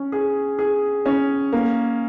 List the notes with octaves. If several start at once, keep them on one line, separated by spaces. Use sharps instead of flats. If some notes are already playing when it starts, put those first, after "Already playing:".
Already playing: C#4
G#4
G#4
C#4
A#3